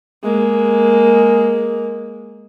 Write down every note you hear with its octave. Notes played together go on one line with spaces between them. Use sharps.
G#3 A#3